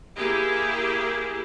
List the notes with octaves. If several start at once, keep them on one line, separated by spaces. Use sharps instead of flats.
A#3 E4 G4 G#4